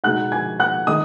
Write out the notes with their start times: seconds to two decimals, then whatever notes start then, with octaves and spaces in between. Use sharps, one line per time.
0.04 B2 G#3 D#4 F#5 F#6
0.32 G#5 G#6
0.59 F#5 F#6
0.87 D#3 G#3 D#4 D#5 D#6